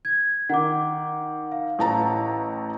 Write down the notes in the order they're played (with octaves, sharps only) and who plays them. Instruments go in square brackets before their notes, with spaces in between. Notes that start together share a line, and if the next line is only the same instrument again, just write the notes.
[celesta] G#6
[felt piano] D#3 [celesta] F#5 D6
[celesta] F5
[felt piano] A1 A5 A#5